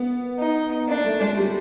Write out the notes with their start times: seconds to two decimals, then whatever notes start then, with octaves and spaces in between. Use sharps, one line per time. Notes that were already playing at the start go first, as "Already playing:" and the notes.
Already playing: B3
0.39 D#4
0.88 A#3 D4
1.05 A3
1.21 G#3
1.37 G3